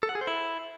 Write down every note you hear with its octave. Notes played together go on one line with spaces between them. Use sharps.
A4
F#5
G#4
C5
E4